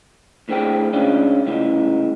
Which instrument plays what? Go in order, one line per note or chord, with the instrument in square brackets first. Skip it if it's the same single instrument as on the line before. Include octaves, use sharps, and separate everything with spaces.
[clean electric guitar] D2 A2 D3 C4 G#4 G5
C#3 G#3 C#4 D4 F4
C2 A2 C#3 E3 G#3